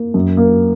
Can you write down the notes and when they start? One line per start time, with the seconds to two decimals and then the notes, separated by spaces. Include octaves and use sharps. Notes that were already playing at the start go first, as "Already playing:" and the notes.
Already playing: A#3
0.14 F#2
0.37 A#3